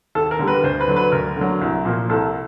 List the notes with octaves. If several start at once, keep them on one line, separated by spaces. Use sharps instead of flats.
D#2 A4
A#4
D3 G3
B4
D2 C5
B4
D3 F#3
B4
D2 A#4
D3 F#3
C2
A#2 F3 A#3
C2 A4